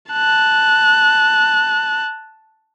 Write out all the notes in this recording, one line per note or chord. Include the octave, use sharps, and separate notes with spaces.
A5 F#6